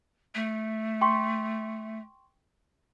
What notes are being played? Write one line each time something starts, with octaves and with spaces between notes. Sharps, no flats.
A3
G5 C6 C#6